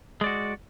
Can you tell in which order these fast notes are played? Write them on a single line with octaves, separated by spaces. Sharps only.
G#3 D5 F#4